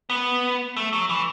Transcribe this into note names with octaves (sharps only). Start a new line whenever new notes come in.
B3
A3
F#3
E3